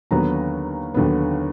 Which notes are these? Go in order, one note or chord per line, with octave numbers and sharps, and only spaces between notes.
D#2 D3 F#3 B3 A#5
D#2 D3 F#3 B3